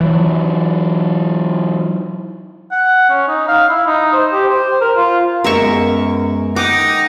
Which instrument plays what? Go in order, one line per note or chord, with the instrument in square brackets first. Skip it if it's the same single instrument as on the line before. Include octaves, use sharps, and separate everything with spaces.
[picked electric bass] E3 F#3
[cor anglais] F#5
C#4
D#4
F5
E4
D#4
C5
G4
C5
A#4
F4
[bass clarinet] F#2 [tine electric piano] G#3 B3 [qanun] A#4 E5 C#6
[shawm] D#4 [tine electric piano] F#5 G5 D#6 [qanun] D6